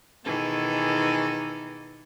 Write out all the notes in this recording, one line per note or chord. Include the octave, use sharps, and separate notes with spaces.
B2 D#3 E3 G#4 A4